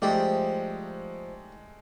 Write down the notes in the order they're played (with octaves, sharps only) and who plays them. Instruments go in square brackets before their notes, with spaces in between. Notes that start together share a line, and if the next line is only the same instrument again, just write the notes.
[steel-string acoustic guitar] F3 C5 E5 [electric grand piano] G#3 A3 [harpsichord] D#4 G4 D5